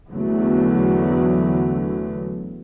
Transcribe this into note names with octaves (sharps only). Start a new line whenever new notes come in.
E2 D3 F#3 A3